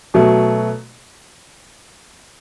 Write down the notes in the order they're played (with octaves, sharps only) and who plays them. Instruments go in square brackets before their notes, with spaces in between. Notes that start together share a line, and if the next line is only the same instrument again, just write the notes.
[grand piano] B2 F#3 A3